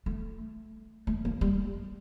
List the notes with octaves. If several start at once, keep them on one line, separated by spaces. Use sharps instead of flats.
A3
A3
A#3
G3